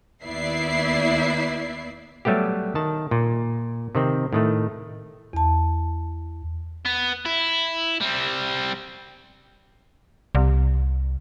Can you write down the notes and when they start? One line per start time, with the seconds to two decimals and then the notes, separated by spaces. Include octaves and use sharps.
0.22 D#2 B3 E4 D5 E5 C7
2.25 F#3 G3 A3 B3 G4
2.75 D#3 A5
3.11 A#2
3.95 C3 D#3 C4
4.33 A2 D#3 A3
5.33 E2 A5
6.85 B3
7.25 E4
8.01 G3 C4
10.35 C2